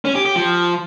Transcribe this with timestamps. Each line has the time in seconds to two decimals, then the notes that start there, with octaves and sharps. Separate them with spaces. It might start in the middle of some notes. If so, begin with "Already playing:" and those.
0.05 C#4
0.15 G4
0.25 G4
0.36 F3